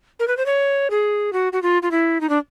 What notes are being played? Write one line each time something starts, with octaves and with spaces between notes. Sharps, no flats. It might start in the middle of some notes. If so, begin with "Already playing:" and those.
A#4
B4
C5
C#5
G#4
F#4
F#4
F4
F4
E4
D#4
D4